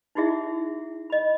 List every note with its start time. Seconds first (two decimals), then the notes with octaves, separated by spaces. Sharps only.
0.15 D#4 E4 F#4 G#4 E5
1.10 D#5 B5